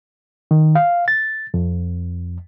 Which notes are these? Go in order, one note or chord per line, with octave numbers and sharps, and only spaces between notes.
D#3
F5
A6
F2